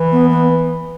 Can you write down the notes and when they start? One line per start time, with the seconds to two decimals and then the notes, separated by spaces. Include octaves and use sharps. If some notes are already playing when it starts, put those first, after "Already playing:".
Already playing: E3
0.11 B3
0.30 B3